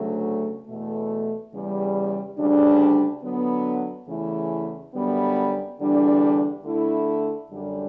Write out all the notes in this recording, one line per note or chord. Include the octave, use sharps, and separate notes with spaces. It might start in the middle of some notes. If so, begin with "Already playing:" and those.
Already playing: D2 C#3 F#3 A3
E2 B2 A3
E2 C#3 G3
D2 C#3 G3 D4
D3 F#3 B3
E2 C#3 E3 A3 E4
F#2 D3 G3 B3
E2 D3 G3 D4
D3 A3 E4
F#2 D3 G3 D4